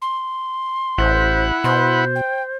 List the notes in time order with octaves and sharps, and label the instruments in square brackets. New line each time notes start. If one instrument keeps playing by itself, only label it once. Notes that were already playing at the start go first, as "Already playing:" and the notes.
[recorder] C6
[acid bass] A1 [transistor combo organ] E4 F#5 B5 [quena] C5
[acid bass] B2 [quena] C5 [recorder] C6
[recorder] G5